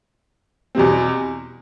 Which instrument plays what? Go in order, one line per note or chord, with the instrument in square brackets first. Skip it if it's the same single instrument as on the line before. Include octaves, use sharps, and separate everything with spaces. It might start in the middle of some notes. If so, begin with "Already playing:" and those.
[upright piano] E2 B2 G3 C4